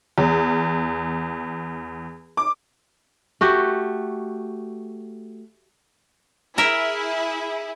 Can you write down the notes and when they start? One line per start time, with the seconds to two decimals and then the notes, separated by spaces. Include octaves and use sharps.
0.18 E2
2.37 D6
3.41 A3 F#4 G4
6.58 E4 G#4 A#4 E5